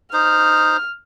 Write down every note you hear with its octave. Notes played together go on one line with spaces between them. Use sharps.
D#4 C5 F6